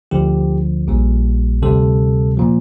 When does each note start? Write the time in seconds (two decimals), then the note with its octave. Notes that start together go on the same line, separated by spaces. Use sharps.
0.11 D2 D3 F3 G4
0.87 A#1 A#2 G3
1.62 D2 C3 G3 A4
2.37 A#2 F3